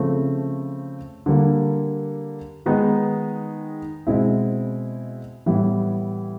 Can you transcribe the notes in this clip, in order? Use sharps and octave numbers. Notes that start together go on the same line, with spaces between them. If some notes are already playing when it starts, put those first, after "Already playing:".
Already playing: C#3 F3 A3 C4
D3 G3 A#3
D#3 G#3 B3 D#4
B2 G#3 C4 E4
A2 E3 G3 B3 E4